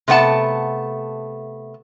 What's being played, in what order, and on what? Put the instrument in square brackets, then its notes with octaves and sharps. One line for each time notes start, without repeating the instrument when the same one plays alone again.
[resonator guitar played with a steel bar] C3 A3 B3 F#5 A5